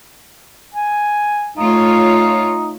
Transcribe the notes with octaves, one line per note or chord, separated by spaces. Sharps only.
G#5
A3 D#4 F4 C#5